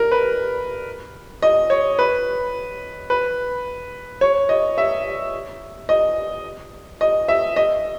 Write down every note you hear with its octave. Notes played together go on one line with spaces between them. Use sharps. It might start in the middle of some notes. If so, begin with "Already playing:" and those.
Already playing: A#4
B4
D#5
C#5
B4
B4
C#5
D#5
E5
D#5
D#5
E5
D#5